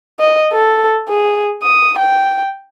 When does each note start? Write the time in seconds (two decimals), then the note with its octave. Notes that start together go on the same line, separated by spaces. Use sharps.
0.20 D#5
0.53 A4
1.09 G#4
1.63 D#6
1.98 G5